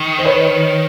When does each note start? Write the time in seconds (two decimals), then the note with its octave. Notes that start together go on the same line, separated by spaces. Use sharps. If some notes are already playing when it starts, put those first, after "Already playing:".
Already playing: D#3
0.19 C5
0.25 B4 C#5